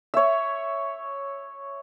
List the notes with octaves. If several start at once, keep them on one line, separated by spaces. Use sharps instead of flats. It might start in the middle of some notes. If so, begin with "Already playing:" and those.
C#5 E5